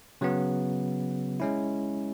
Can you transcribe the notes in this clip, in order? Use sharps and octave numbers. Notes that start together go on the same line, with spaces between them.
C#3 F#3 B3
G#3 C#4 E4